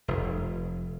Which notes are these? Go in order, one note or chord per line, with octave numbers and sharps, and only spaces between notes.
F1